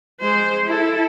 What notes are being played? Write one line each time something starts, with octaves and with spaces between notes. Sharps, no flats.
G#3 C5
E4 A4